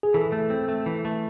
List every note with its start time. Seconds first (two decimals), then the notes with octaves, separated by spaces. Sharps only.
0.03 G#4
0.14 E3 A4
0.32 A3
0.50 C4
0.68 A3
0.86 E3
1.05 A3